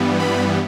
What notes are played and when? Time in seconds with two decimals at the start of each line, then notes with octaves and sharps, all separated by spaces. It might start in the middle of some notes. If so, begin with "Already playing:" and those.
Already playing: G2 E3 G3 B3
0.20 B5